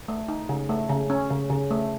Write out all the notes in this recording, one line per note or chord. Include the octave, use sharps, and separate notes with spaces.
A3
D#4
C#3
A3
C#3
C#4
C#3
C#3
A3